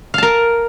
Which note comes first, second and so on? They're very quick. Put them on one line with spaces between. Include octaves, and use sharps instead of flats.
F5 A5 A#4